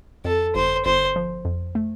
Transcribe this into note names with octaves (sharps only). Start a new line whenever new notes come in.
F2 A4
G1 C5
G1 C5
F3
F2
A3